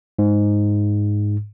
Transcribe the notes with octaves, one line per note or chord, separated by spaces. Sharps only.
G#2